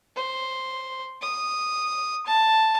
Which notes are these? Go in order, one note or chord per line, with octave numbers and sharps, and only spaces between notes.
C5
D#6
A5